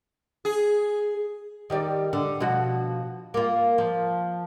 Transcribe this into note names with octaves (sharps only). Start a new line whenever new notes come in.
G#4
D#3 G3 D5
D3
B2 F3 F#4
A#3 F4
F3